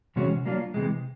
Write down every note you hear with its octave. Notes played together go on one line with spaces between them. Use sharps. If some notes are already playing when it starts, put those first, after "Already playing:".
C3 E3 G#3 C#4 F#4
F#3 A#3 D4 F4
C3 E3 G#3